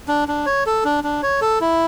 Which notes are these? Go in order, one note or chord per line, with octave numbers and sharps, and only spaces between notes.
D4
D4
C#5
A4
D4
D4
C#5
A4
E4